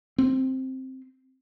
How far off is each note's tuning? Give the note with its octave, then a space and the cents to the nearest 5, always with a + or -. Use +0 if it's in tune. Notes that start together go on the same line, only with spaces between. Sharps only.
C4 +5